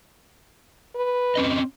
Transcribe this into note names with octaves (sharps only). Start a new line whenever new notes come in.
B4
C4 C#4 D#5